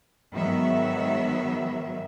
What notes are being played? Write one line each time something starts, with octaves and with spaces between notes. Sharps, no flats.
G#2 D#3 F#3 B3 E5